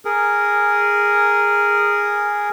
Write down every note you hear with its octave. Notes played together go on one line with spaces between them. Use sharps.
G#4 A#4